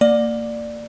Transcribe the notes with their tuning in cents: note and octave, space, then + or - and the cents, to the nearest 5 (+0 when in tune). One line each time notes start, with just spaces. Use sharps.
A#3 -30 D5 +10